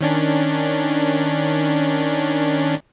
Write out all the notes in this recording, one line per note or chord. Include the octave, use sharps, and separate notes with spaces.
D#3 C#4 D4